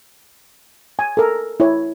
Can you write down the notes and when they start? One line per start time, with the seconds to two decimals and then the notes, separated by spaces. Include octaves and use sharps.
0.99 G#5
1.17 A4 A#4
1.60 E4 C#5